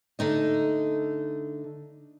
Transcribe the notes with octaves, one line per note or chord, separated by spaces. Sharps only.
D3 A3 D#4 D#5